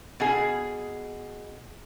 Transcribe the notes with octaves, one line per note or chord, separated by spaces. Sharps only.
B2 G#4